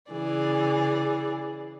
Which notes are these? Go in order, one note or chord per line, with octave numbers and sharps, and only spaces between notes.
C#3 E3 G#4 D5